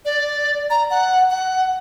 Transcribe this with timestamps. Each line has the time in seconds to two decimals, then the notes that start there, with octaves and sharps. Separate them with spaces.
0.05 D5
0.70 A#5
0.90 F#5
1.30 F#5